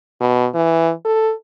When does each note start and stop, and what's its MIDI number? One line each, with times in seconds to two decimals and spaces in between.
0.21 0.48 47
0.54 0.92 52
1.05 1.32 69